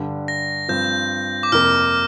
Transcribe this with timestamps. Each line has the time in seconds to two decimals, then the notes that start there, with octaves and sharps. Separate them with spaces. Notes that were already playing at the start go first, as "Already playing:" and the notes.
Already playing: G2 D3 G3
0.28 A#6
0.69 G2 F3 C4 G6
1.43 D6
1.52 F2 C3 A#3 F6